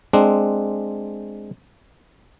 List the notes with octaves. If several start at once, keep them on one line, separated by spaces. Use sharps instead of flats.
G#3 C4 D4